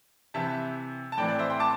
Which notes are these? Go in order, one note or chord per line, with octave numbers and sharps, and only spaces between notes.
C3 E3 C4 E5 A5
A5
A2 E3 C4 D5 G5
D5
C5 E5
G5 C6
A5 D6